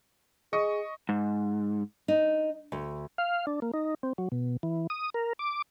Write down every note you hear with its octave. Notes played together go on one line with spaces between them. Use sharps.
G#4 D#5 C#6
G#2
D#4
D2
F5
D4
A#3
D#4
C4
F#3
B2
E3
D#6
A#4
D6